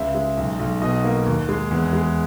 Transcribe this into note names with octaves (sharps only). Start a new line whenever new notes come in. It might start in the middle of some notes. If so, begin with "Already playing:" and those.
Already playing: C#2 E5
G#3
B1
B1
B2 D#5
A#3
D#2
G#3
E2
G#3